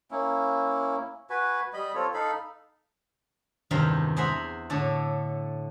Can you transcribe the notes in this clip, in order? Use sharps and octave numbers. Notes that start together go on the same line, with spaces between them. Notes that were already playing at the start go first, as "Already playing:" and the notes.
A#3 C#4 E4
F#4 B4 G#5
G3 D#5 B5
C4 F4 A4 C#5
D#4 A4 F5 B5
E2 G2 C3 D#3 G3 F5
G#4 C5 E5 F#5 A#5 B5
A2 D3 A4 C#5